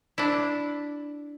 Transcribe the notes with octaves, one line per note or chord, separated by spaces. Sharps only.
D4 E4